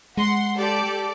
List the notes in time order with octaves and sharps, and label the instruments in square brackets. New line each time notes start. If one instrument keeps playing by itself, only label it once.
[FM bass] G#3 [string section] F#5 C6
[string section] G4 A4 D5